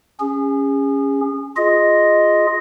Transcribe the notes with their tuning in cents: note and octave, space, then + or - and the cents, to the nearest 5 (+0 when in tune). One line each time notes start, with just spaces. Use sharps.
C#4 +0 G#4 -35
F4 +0 G#4 +0 D#5 +0